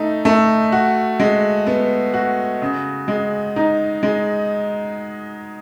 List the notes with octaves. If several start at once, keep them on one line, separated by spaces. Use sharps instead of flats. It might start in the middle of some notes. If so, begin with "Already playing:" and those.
Already playing: A3 D#4
A3
F#4
G#3
B3
F#4
C#3
G#3
D#4
G#3